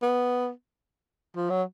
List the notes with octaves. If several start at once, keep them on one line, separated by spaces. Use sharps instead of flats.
B3
F3
F#3